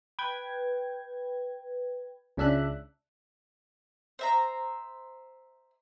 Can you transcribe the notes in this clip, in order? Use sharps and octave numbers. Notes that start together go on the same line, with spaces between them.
B4 G5 G#6
C#2 C#3 D4 E5 F#6
C5 E5 A#5